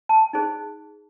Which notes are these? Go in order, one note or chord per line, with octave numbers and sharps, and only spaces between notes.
A5
D#4 G#4 C5